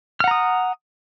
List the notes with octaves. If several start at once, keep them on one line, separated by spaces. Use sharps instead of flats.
F#5 A#5 D#6 F6